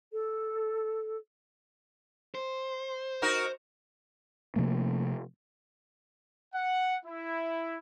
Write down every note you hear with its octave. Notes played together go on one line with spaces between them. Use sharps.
A4
C5
D#4 F#4 A#4
C3 F3 A3 A#3
F#5
E4